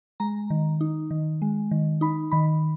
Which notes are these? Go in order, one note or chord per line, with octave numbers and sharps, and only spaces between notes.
G#3 A#5
D#3
D#4
D#3
G#3
D#3
D#4 B5
D#3 B5